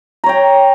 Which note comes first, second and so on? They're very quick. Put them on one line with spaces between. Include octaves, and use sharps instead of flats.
A#5 C#5 G5